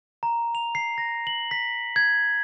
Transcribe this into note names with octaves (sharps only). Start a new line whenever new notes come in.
A#5
F7
C7
A#6
F#7
B6
G#6